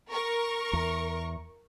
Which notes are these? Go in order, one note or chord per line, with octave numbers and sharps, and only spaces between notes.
A#4 C#6
E2